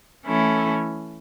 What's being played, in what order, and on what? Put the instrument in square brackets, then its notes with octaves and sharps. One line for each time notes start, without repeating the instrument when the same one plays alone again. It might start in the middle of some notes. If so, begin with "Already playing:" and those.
[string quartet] E3 A3 C#4 E4 A4